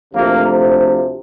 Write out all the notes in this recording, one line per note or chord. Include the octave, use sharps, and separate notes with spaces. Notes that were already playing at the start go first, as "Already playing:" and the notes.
D2 C3 F3 A#3